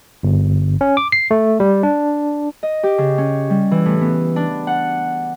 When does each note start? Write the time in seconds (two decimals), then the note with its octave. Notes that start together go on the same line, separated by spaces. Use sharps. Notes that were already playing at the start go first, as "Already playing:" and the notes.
0.23 G1
0.81 C#4
0.97 D6
1.12 C7
1.31 A3
1.60 G3
1.83 D4
2.63 D#5
2.83 G4
2.98 C#3
3.18 C#4
3.50 G3
3.71 E3
3.86 A2
4.01 B3
4.36 D4
4.67 F#5